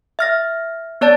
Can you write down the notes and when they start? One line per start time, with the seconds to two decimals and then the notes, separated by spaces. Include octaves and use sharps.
0.19 E5 F6 A#6
1.01 B3 C#5 D5 A5 A6